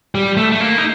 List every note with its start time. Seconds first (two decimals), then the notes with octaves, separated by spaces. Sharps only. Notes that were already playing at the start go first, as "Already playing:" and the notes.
0.15 G3
0.37 A3
0.52 A3
0.60 A#3
0.78 D#4